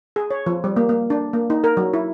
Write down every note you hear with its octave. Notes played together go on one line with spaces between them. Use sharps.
G#4
C#5
F3
G3
A#3
A#3
D4
A#3
D#4
A#4
F#3
E4